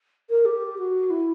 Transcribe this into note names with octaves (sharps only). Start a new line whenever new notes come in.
A#4
G4
F#4
E4